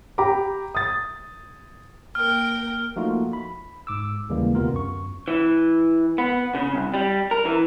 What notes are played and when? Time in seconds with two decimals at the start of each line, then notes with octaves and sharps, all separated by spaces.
0.18 G4 G5 A#5 B5 D6
0.75 D#6 A6
2.15 A#3 A#4 G5 F6
2.96 F3 A3 A#3 D#4 F4 F#4
3.33 B5
3.87 G#2 D6 E6
4.29 D#2 C#3 E3 G3 G#3 A#3
4.55 D2 C3 B3 F4 A#4
4.72 F#2 C#6
5.28 E3
6.18 B3
6.55 C#3
6.74 C2
6.94 G3
7.31 A#4
7.45 E3